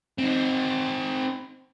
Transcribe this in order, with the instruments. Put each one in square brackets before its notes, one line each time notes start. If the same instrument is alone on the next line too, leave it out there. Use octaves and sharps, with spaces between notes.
[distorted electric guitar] C4 D#4